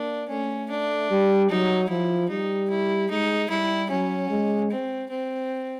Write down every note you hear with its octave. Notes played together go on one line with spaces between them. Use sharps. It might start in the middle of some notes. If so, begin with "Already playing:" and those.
Already playing: A#3 D4
A3 C#4
D4
G3
F#3 D#4
F3 E4
G3 D#4
E4
G#3 D#4
G3 E4
F#3 C#4
G#3
C4
C4